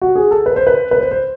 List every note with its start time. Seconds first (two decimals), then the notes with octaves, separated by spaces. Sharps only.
0.02 F#4
0.16 G#4
0.31 A4
0.46 B4
0.56 C5
0.67 B4
0.91 B4
1.01 C5
1.11 C5